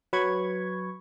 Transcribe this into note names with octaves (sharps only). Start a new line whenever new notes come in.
F#3 B4 B5 C#6 G#6